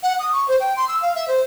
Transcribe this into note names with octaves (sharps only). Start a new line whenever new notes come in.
F#5
D#6
C#6
C5
G5
C6
E6
F5
E5
C5